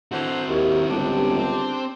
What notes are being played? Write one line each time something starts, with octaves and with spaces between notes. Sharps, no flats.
D3 E3 C4 F#4 C5
D#2 D#3 F#3 E4
G1 C#2 D4 G4
C4